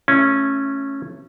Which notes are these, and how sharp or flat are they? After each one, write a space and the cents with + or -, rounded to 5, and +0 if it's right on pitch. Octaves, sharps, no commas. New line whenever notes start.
A3 -5 C#4 -10 E4 +20